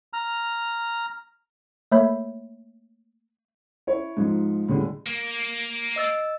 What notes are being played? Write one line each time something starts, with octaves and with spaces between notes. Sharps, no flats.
A#5 F6
A3 A#3 C#5 E5 B5 G6
E4 C#5
G#2 F3 D#4
A2 D3 G3 G#3
A#3
D#5 E6 A6